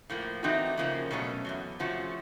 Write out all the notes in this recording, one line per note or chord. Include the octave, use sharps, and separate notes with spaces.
A2 F3 A#3
E3 A3 C4 D#4 F#4
C#3 F3 A#3 C#4
B2 F#3 A3 C#4
E2 B2 F#3
C3 F3 A3 C#4 F#4